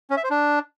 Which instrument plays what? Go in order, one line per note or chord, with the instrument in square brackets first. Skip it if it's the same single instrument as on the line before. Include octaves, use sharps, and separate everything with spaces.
[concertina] C#4
E5
C5
D4